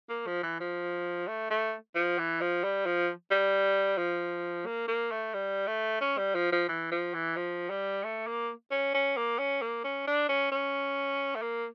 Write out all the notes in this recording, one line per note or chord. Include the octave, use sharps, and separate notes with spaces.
A#3
F3
E3
F3
A3
A3
F3
E3
F3
G3
F3
G3
F3
A#3
A#3
A3
G3
A3
C#4
G3
F3
F3
E3
F3
E3
F3
G3
A3
A#3
C#4
C#4
A#3
C#4
A#3
C#4
D4
C#4
C#4
A3
A#3